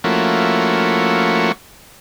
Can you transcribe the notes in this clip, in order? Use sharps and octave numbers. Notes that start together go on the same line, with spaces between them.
F3 A3 A#3 C#4 E4 F#4